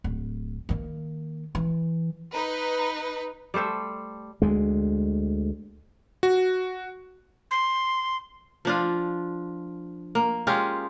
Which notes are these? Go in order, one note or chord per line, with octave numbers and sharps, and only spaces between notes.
D1
D#3 A#3
E3
D#4 B4
G3 A3 C5 E5
D2 G#3
F#4
C6
F3 D4 F4
A#3
G#3 C#4 F4 G4